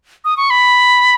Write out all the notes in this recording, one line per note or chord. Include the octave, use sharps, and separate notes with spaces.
D#6
C#6
B5